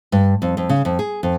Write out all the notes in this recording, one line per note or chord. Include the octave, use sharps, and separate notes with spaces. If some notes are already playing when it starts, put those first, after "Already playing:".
G2
F2
F2
C#3
F2
G#4
F2